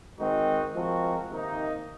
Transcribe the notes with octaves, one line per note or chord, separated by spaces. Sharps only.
D#3 G#3 C4 D#4 F#4
F3 G#3 C4 F#4 A#4
C3 D#3 A#3 D#4